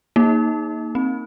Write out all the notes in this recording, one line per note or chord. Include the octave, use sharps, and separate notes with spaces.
A#3 D#4
C4